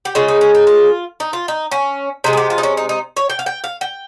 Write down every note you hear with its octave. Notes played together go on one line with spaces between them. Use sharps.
G4
C#3 G#3 F4
D#4
C#4
D#4
F4
D#4
F4
D#4
C#4
C3 D#3 G#3 D#4
G#4
G4
F4
D#4
C#4
D#4
D#4
C#5
G5
F5
G5
F5
G5